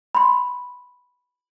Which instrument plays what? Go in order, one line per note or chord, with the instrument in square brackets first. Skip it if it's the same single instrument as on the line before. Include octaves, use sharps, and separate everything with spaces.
[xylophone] B5 C6